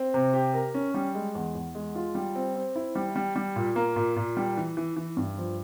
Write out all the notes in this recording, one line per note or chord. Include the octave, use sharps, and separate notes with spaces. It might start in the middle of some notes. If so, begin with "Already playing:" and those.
Already playing: C4
C3
G4
A#4
C#4
G3
G#3
E2
E2
G#3
F4
G3
C4
C4
E4
G3
G3
G3
A#2
A#3
A#2
A#2
G3
E3
E3
E3
G2
F3